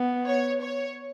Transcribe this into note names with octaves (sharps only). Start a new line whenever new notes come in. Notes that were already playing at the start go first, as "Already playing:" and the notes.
Already playing: B3
C#5
C#5